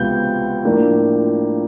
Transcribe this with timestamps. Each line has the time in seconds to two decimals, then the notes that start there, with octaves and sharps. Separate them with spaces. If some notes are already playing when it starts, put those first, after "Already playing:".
Already playing: C#2 C3 F3 G#3 B3 G6
0.65 A2 F3 A#3 D4